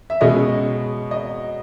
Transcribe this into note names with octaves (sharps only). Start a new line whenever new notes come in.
E5
B2 G#3 C#4 D#5
D#5